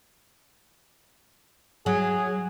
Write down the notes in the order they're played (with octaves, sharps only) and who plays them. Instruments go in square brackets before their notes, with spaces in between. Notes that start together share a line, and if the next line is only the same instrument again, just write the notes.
[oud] F#3 [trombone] G#4